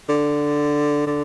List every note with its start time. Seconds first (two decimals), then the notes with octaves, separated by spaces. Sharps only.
0.09 D3
1.07 D3